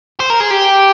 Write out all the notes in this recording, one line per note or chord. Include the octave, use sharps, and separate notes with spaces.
C5
A#4
G#4
G4